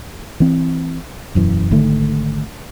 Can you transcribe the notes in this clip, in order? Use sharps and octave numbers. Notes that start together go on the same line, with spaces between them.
E3 C4
E1 F#2 E3
G#1 D3 D#3 A3